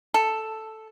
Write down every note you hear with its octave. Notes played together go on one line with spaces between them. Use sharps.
A4